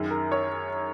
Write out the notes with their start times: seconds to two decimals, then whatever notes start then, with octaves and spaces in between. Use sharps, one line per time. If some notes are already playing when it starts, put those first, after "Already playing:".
Already playing: F#2 D#3 G#4
0.11 A#4
0.32 C#5